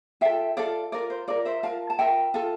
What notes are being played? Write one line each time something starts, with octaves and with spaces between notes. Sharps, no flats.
F4 A4 E5 G5
F4 A4 D5 F5
F4 A#4 D5
C5
F4 A#4 D5
C5 E5
F4 A#4 F5 A5
A5
F4 A#4 E5 G5
F4 A4